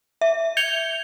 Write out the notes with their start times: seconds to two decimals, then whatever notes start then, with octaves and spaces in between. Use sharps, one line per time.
0.21 E5
0.57 G6 G#6 C#7 F7 G7